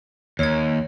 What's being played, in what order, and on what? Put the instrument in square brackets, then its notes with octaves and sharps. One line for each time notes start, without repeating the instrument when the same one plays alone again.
[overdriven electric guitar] D#2 [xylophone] C#5 G#6